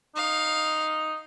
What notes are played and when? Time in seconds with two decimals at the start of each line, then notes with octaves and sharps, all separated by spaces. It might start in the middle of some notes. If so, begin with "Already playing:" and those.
0.16 D#4 F5